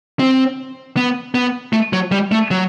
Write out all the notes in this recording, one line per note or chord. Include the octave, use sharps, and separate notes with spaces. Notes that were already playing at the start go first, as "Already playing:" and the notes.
C4
B3
B3
A3
F#3
G3
A3
F#3